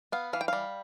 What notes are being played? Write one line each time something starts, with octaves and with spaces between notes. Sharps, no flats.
B3 F5
E3 F5
G5
G3 F5